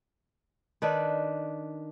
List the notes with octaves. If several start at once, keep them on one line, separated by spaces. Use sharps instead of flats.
D#3 D4 B4